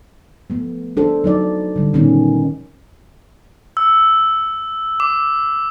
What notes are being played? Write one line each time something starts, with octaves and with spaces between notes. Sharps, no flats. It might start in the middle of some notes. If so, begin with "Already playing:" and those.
F3 A3 B3
D4 A4 C5
F#3 D#4 D5
D3 G3
A#2 D#3 B3 C#4
E6
D6